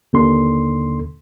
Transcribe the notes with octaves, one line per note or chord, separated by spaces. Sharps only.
D#2 D3 C6